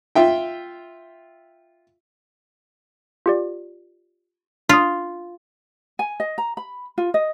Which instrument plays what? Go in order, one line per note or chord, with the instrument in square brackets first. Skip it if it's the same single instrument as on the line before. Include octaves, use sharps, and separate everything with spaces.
[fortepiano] F4 E5 G5
[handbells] F4 G4 D5
[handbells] D4 D#6 [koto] F4
[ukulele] G#5
D#5
A#5
B5
F4
D#5